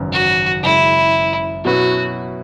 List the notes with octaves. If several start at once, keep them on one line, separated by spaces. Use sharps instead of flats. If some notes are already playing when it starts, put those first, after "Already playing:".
Already playing: G#1 F#2 C#3 E3
F#4
F#1 F#2 C#3 G#3 C#4 E4
B2 F#3 C#4 E4 F#4 B4